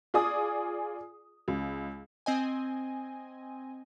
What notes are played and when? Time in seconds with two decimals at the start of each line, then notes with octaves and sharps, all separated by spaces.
0.14 F4 G#4 D5 G#5 D#6
1.48 C#2
2.26 C4 D#5 G#5